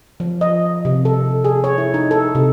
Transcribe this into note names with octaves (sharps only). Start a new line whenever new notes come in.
F3
D#5
C3
A4
G#4
C#5
E4
D#4
A4
C3